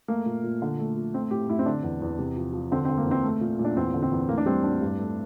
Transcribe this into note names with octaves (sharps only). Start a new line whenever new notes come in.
A3 A#3
A#2
A#2
D3
A3
F3
A3 C4
A2 G4
A2 E4
C4
D3 D4
E2
E2
C3
F3
F3
D3 C4
C4
D3
A#3
E2
C4
A3
A#2
A#2
D4
E2 C4
D3
C4
E2
A2 A#3
D4
G3 C4
A2 D4
G2
A3